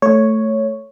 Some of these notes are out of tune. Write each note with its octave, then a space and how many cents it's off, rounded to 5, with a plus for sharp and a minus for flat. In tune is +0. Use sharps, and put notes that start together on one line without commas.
A3 +0 C#5 +0